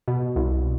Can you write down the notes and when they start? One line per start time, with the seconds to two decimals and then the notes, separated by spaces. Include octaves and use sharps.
0.08 B2
0.36 C2